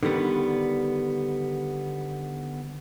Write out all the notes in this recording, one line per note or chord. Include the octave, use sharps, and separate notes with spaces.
D3 D#3 G3 B3